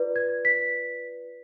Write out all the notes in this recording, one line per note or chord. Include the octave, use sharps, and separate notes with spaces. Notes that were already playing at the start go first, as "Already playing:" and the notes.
Already playing: F4 B4 D5
G#6
B6